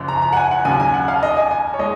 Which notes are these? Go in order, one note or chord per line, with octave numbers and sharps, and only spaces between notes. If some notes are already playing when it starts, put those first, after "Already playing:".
Already playing: F#1 F#2 F3
A#5
A#5
F#5
G#5
F#5
D#2 C#3 F#3 G#5
G#5
F#5
F5
D#5
G#5
G#5
C#5
G#3 D#5